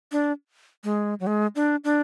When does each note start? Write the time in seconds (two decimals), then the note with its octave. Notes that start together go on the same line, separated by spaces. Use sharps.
0.12 D4
0.84 G#3
1.20 F#3
1.27 G#3
1.56 D4
1.84 D4